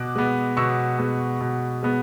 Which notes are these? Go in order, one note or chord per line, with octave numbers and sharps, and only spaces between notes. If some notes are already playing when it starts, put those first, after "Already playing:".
Already playing: B2 D6 F#6
G#3 B3
B2 C#6 E6
G#3 B3
B2
G#3 B3